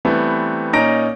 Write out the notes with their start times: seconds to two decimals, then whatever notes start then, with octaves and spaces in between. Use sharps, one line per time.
0.05 E3 G3 A3 B3 C4
0.73 A#2 C#4 D#4 A#5 A#6 D7